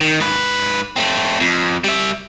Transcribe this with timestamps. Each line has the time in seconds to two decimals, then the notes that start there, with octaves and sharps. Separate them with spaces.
0.01 D#3
0.20 G#2 B4
0.96 A3 C4
1.40 F2
1.84 G3 E5